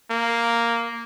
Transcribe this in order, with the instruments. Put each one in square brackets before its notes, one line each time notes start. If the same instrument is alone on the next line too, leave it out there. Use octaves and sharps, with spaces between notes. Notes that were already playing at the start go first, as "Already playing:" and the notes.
[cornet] A#3